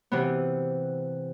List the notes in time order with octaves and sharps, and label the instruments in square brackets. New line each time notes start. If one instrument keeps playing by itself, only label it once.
[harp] C3 E3 B3